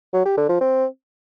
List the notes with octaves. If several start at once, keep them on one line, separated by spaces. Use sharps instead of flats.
F#3
G4
D3
F3
C4